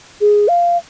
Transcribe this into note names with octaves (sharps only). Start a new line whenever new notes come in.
G#4
F5